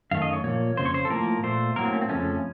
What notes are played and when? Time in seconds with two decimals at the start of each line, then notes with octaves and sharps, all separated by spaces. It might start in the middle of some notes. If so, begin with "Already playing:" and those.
0.11 F#2 D#3 A3 F5
0.22 D#5
0.33 C#5
0.44 A#2 F3 A#3 C#5
0.77 F2 C#3 C5
0.85 C#5
0.94 C5
1.05 A4
1.10 A2 F3 A#3 A#4
1.43 A#2 A3 C5
1.76 A2 F#3 A#3 A#4
1.85 C4
1.93 C#4
2.01 C4
2.09 F2 C#3 F3 A3 C#4